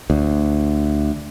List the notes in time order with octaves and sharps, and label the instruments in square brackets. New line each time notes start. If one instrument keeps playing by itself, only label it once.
[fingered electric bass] D2